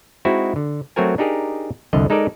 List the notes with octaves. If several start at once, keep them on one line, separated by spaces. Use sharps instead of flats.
G#3 C4 D#4 E4 F#4
D3
F#3 A3 C4 F#4 A#4 G#5
D4 D#4 G4 G#4 A#4
C2 F2 D3 D#5
G#3 D#4 A4 A#4 D5